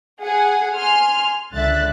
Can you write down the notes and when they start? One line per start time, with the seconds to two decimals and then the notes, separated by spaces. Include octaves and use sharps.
0.22 G#4 F#5 G#5
0.76 G#5 C6 F6
1.54 C#2 D3 E5 F#6 A6